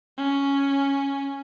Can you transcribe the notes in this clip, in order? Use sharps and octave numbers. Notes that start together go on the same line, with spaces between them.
C#4